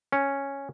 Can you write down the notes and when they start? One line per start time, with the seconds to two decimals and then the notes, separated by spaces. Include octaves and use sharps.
0.12 C#4